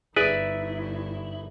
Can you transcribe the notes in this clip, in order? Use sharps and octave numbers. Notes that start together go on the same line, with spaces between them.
G1 D#4 E4 G#4 B4 D5